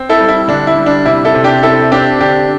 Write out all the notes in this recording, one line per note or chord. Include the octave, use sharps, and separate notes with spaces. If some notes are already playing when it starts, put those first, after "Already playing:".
Already playing: C4
E4 A4
G3
E4
D3 D4
E4
G3
D4
C3 E4
E4 A4
C3
D4 G4
C4 E4 A4
C4 D4 G4
D3 D4 G4